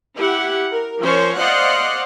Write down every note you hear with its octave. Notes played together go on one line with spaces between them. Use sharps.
E4 G4 F#5
A#4
F3 C#4 A#4 C5 C#5
C5 D5 D#5 F5 F#5 C6